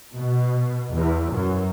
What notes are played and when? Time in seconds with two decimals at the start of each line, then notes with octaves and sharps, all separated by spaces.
0.16 B2
0.94 E2
1.34 F#2